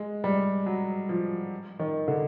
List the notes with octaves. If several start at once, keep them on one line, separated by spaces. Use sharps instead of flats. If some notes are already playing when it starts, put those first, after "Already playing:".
Already playing: G#3
G3
F#3
F3
D#3
D3